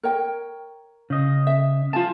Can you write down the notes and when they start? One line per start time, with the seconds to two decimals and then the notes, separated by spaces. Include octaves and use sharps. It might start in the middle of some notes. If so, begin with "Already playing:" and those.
0.03 A#4 C#5 G5
1.10 C#3 D#5
1.47 E5
1.93 F4 F5 G#5 A5